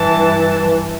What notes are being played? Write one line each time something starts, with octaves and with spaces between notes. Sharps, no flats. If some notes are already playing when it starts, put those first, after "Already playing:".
Already playing: G2 E3 A5